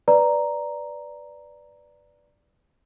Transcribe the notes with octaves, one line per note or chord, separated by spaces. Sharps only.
B4 D5 A#5